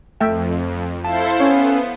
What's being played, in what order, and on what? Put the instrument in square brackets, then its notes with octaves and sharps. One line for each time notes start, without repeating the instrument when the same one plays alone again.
[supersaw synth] F2 [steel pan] A3 E5 G5
[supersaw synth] E4 A4 C5 [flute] F5 [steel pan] A5
[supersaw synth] B3 [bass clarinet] C#4 [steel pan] C#5